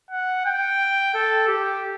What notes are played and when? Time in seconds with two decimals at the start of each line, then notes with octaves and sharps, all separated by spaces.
0.11 F#5
0.46 G5
1.14 A4
1.47 G4